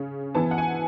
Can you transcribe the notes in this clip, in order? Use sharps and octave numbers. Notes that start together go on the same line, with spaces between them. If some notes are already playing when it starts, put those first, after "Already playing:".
Already playing: C#3 C#4
E3 B3 A5
F#5
G#5